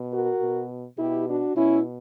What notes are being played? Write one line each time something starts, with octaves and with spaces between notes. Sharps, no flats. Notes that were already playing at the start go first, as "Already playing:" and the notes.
Already playing: B2
F#4 A#4
B2
B2 E4 G4
D4 F#4
B2 C#4 E4